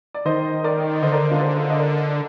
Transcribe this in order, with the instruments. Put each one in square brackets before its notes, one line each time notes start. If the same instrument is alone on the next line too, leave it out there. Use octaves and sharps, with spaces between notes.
[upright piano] D5
[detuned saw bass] D#3 [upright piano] C5 D#5
[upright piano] A#4 D5
[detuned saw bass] D3 [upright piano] C5 D#5
[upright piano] A#4 D5
D4 F4
G#4 C5
D#5
A#4 D5